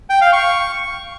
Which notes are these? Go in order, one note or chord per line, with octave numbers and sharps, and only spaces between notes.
G5
F5
C#6